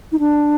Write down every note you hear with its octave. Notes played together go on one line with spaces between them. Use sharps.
D#4
D4